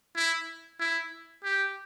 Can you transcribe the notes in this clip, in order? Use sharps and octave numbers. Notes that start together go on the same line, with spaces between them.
E4
E4
G4